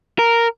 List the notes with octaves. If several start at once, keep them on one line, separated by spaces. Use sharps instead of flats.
A#4